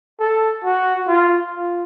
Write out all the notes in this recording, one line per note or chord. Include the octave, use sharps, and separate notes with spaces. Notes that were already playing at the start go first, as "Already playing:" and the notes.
A4
F#4
F4
F4